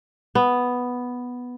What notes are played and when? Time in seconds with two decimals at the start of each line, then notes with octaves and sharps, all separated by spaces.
0.35 B3